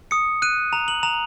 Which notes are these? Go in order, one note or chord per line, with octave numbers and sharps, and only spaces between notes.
D#6 C#7
F#6 D#7
A#5 F7
F#7
A#5 F7